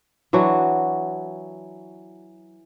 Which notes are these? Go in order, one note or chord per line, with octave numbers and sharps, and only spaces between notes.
E3 F#3 D4 F#4